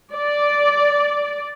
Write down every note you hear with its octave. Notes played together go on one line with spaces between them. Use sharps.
D5